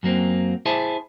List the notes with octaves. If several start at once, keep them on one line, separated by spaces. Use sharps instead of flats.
F#2 F#3 A#3 C4
E4 G#4 C5 E5 G#5 A5